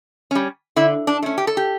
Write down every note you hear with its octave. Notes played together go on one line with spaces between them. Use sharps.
G3 C#4
D3 E4
D4
A3 C#4
G4
A4
G4